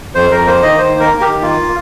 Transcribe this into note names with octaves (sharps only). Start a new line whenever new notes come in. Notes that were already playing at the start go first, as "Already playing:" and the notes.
F2 C5
F2 A#4
A#3 C5
D#3 D#5
D#3 C5
A#3
A#4
A#3
G4
D#3
A#3 F4